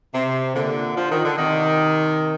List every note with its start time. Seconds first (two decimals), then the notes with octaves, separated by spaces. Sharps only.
0.15 C3
0.56 A#2 D3
0.97 F3
1.11 D#3
1.25 D3
1.38 C3 D#3